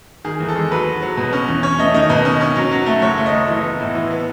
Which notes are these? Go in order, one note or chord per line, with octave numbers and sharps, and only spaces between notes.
D#3 G#4
E2
A4
G#3
F#3 B4
F#3
F#3
B2
C#4
E2
C#4 C#5
A3 D#5
D#3 D#5
B2 D#5
C#4
C#4
F#3
F#3
A3
F#1 C#5
A3
D#5
F#1
E3 D#5
B3
A2
E3
B3